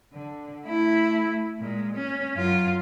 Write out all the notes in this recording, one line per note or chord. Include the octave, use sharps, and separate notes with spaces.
D3
A3 E4
A#2 G#3
C#4
F#2 F4